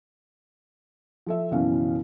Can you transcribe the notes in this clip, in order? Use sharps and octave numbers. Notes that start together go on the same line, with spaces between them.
F3 A4 E5
F#1 B2 E3 C#4 F5